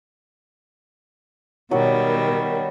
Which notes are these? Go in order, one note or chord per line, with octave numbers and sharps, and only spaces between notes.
B2 D#3 F#3 G3